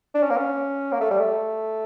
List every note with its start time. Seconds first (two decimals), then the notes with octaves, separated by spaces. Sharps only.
0.15 D4
0.23 C#4
0.30 A#3
0.37 C#4
0.92 A#3
1.01 A3
1.11 G3
1.19 A3